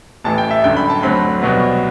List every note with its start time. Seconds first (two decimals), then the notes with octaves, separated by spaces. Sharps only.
0.24 A1 A2 E3 A5
0.38 G5
0.51 E5
0.64 G1 F#2 D3 G5
0.77 B5
0.90 A5
1.03 D2 D3 F#3 C4 B5
1.42 C2 B2 F#3 B3